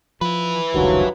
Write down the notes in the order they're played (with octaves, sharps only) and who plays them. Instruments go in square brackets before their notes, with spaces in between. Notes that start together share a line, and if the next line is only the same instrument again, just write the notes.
[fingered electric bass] F3 [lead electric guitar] E4 B4
[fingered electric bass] F1 C#2 D#3 [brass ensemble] G2 F3 F#3